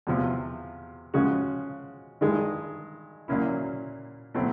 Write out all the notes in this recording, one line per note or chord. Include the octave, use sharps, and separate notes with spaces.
E2 C3 F3
C#3 F3 G#3 C#4 F#4
G2 D#3 G#3
A#2 F#3 A#3 C#4 E4
B2 F#3 A3 C4